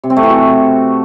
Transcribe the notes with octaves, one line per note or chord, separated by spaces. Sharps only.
C3
C4
A3
E3
F#4